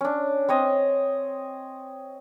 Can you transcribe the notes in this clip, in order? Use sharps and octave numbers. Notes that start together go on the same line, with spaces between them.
C#4 D4
C4 C#5 D#5